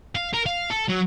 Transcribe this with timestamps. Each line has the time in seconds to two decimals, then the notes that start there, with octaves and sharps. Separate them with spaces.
0.16 F5
0.34 A#4
0.46 F5
0.70 A4
0.89 F#3